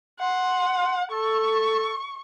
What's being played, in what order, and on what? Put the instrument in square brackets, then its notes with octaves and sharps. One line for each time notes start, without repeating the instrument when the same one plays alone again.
[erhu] F#5 [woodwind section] C6
[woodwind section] A4 [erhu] C#6